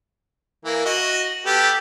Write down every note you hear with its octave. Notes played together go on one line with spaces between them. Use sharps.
E3 A#3
F#4 D#5
B3 G4 A4